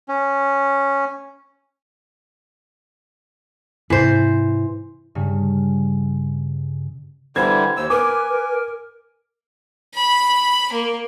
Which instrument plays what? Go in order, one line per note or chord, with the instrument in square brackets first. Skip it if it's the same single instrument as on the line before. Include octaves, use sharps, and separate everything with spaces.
[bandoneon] C#4
[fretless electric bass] G#2 C3 C4 [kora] E3 C5
[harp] G2 C#3
[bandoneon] D3 E3 G3 [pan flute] C5 [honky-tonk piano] G#6
[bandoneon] D#2 E6 [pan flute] C5
[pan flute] A#4 [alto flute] B4 [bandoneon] G#5 [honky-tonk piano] D6
[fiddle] B5
A#3